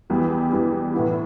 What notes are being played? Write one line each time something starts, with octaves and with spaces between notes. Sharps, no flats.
E2 E3 G3
E2 E3 G3
A2 E3 B3 E4